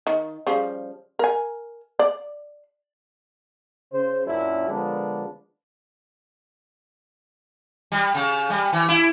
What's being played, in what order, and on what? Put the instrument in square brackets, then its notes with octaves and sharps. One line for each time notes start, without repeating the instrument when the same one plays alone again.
[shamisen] D#3
C#3 F3 G3
A#4 G#5
D5
[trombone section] C#3 C5
F#2 A#2 F#3 C#4 D4 E4
D3 F3 G#3 A#3 B3 D4
[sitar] G3
C#3
G3
E3
E4